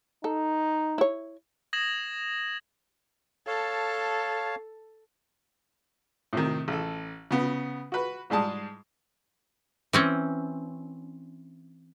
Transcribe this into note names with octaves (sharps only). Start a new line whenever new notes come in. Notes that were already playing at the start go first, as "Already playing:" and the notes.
D#4 A4
E4 C#5
D#6 G#6 A#6 E7 F#7
A4 C#5 F5 A5
A2 C3 D#3
A1 A4
C#3 B3
F#4 B4
G#2 G3 G#3 A5 D#6
E3 C4 C#4